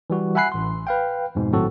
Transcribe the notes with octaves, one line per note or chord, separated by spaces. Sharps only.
E3 G3 F#4
E5 F#5 G#5 B5 F#6 C7
A1 C6
B4 F5 G5
F2 G#2 B2
G#1 A2 F#3 C4 F#4 A4